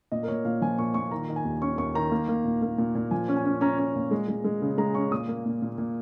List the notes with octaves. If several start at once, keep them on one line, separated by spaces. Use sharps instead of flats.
A#2 D#5
A#4
A#2 C#5
A#2 F5
F3 G#5
A#2 C#6
A#2 C#6
D#3 A#5
D#3
G#5
D#2
C#4 C#6
D#2 C#6
D#3 A#5
A#3
A#3
A#2
A#3
A#2
A#2
F3 G#5
C#4
G#5
C#4
C#4 A#5
C#4
A#2
G#3
G#3
G#3
C#3
G#3 A#5
C#4 C#6
A#2 D#6
A#3
A#2
A#2
A#2